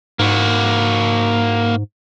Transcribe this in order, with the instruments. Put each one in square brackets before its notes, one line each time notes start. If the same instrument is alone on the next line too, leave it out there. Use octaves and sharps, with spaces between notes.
[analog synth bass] G#2 [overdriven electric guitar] A#3 F#4